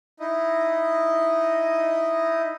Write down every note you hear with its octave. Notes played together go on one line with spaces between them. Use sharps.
D#4 E4 D#5